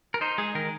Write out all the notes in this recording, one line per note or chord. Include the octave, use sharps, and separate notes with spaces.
A#4
D#4 C5
G#3 G#4
D#3 A#4